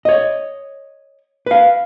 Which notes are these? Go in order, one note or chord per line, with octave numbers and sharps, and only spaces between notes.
C#5 D#5
B4 F5